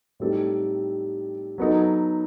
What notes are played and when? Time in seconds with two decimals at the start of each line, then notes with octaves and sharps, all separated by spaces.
0.20 A2 G3 C4 D#4 A4
1.58 F#3 B3 D#4 A4